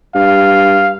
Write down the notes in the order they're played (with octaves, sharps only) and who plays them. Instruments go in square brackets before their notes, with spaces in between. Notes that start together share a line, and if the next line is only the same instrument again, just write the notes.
[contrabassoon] G2 [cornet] F5